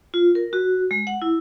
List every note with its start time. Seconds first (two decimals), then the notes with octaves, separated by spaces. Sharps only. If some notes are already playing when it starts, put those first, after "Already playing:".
0.14 F4
0.35 A#4
0.53 F#4
0.91 G#3
1.07 F#5
1.22 E4